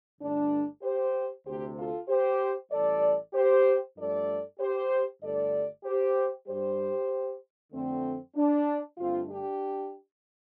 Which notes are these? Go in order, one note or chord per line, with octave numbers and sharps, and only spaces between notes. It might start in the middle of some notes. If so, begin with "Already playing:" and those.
G1 G2 D3 A3 D4
G4 C5
D2 C3 A3 G4 C5
F4 A4
G4 C5
A1 A2 G3 A4 D5
G4 C5
G2 F3 A3 A4 D5
G4 C5
G1 G2 D3 A3 A4 D5
G4 C5
G2 G3 G4 C5
F2 D3 A3 C4
D4
G2 D3 A3 C4 F4
D4 G4